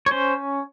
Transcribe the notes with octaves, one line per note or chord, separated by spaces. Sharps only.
C#5
C#4 C5